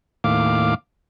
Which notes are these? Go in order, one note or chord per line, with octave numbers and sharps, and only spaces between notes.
D#2 A2 F5 D6